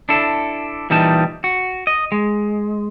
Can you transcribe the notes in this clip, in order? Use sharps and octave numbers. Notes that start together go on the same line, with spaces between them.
D4 E4 A4
A#2 E3 G3 D#4 A5
F#4
D#5
G#3